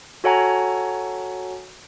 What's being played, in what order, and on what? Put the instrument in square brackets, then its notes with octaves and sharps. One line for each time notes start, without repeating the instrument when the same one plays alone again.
[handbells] F#4 A4 C#5 F#5 G#5 A#5